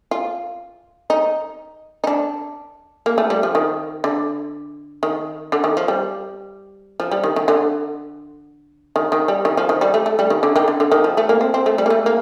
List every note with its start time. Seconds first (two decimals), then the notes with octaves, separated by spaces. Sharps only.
0.11 F4
1.10 D#4
2.04 D#4
2.07 D4
3.06 A#3
3.18 A3
3.30 G3
3.43 F3
3.55 D#3
4.04 D3
5.03 D#3
5.52 D3
5.64 D#3
5.77 F3
5.88 G3
7.00 F3
7.11 G3
7.24 D#3
7.36 D#3
7.48 D3
8.96 D#3
9.12 D#3
9.28 G3
9.45 D#3
9.57 F3
9.69 D#3
9.81 G3
9.94 A3
10.06 A3
10.19 G3
10.30 D#3
10.43 D3
10.56 D#3
10.68 D3
10.80 D3
10.92 D#3
11.04 F3
11.17 A3
11.29 A#3
11.41 C4
11.54 C4
11.66 A3
11.78 G3
11.86 A#3
11.90 A3
12.06 A#3